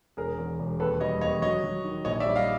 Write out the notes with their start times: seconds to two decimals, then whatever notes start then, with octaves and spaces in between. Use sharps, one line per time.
0.17 E1 G#4 A#4
0.38 E2
0.59 E1
0.80 D#2 A4 B4
1.00 G3 C#5 D#5
1.21 D#2 C#5 D#5
1.42 F#3 C#5 D#5
1.64 F#3
1.84 D#3
2.05 A#1 C#5 D#5
2.20 D5 E5
2.26 G3
2.36 D#5 F5